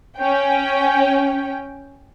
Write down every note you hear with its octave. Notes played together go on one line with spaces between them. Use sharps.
C#4 G5